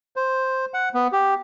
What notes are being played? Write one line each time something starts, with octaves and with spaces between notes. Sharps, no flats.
C5
F#5
B3
G4